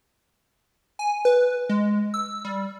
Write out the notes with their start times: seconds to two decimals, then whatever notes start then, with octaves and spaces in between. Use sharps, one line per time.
0.99 G#5
1.25 B4
1.69 G#3
2.14 E6
2.45 G3